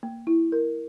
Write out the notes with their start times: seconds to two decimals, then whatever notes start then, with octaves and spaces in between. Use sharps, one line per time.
0.03 A#3
0.27 E4
0.52 A#4